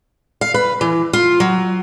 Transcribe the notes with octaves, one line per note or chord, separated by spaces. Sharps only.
F5
B4
E3
F4
F#3